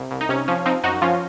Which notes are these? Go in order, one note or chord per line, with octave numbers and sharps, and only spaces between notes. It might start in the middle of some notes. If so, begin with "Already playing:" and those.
Already playing: C2
C2
D#4
C3 C#4
F3 C#4
F3 C4 D#4
F#2 D#4 F#4
F3 C#4 F4